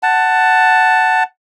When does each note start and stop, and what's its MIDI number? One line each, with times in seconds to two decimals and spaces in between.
0.03 1.23 78
0.03 1.23 81